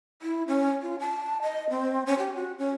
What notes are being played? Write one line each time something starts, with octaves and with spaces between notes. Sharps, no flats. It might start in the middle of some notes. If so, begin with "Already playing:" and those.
E4
C#4
F4
A5
D#5
C4
C#4
G4
F#4
C#4